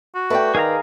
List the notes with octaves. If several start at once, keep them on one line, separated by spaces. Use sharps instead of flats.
F#4
A3 B4 D5 G5
D#3 G#4 F5 A#5